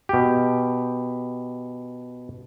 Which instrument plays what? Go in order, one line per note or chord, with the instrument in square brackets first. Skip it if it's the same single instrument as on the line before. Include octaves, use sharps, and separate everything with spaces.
[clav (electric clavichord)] B2 G4